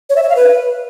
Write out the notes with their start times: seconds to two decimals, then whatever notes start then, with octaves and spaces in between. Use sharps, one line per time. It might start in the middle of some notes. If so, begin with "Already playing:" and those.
0.10 C#5
0.16 E5
0.23 C#5
0.29 F5
0.36 B4